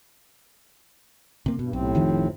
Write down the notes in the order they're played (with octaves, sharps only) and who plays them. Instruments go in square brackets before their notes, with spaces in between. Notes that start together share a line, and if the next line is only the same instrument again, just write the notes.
[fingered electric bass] C3 A#3
[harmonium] G2 [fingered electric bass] B2
[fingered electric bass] B1 [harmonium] A2 C3 C4
[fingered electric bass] F1 D#3 F3